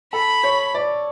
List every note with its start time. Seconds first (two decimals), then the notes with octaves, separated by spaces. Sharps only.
0.13 A4 B5
0.44 C#5
0.75 D5